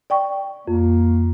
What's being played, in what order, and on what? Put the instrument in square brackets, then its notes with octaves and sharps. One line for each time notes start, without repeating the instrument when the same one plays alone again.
[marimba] D5 G5 C#6
[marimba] F2 [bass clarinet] A#3